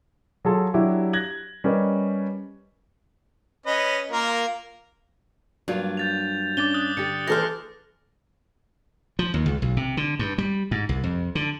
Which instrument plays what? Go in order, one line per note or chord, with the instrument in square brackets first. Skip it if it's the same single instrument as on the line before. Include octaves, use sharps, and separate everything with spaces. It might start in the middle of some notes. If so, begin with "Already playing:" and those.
[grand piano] F#3 F4 G#4 A4
F#3 D4 E4 F#4 G4
F#6 G#6 A#6 F#7
G3 C#4 G4 A#4 B4 D#5
[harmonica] C#4 B4 D#5
A#3 F4 A#4
[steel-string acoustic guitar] G2 [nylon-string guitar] F#3 A#3 F4
[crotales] G6 A6 F7
[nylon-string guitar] C#4 D4 [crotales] D6 A6 G7
[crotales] D#6 F#6 A6
[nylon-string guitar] D3 D4 G4 [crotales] A6 C#7
[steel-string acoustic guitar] E3 A4 C5 [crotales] F6 A#6
[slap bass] F3
D#2
C#2
B1
C3
D3
G2
G3
G#2
C2
F2
D3